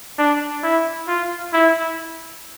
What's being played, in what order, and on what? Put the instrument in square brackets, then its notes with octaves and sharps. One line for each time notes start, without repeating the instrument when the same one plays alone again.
[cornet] D4
E4
F4
E4